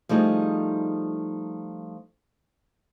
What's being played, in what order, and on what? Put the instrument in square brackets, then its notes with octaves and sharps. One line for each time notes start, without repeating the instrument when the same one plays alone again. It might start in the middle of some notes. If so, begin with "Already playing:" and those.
[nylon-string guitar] F3 G3 A3 D#4 E4 G#4